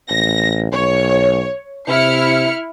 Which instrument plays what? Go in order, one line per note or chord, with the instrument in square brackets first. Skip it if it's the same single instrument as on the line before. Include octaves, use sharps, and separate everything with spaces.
[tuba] A1 [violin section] A#6
[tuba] B1 [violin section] C#5
[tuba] C3 [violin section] E4 F6 C#7